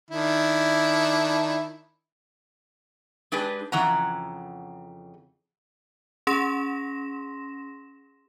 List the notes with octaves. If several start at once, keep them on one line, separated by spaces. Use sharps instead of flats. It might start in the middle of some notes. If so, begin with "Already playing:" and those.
D#3 D4 E4
G#3 D4 G4 G#4 B4
F2 C#3 E3 F#5 A#5
C#4 G#4 C6 A#6 E7